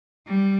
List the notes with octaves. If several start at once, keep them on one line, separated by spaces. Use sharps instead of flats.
G3